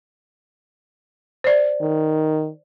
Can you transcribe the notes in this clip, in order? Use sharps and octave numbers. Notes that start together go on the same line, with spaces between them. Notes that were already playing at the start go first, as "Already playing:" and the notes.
C5 D5
D#3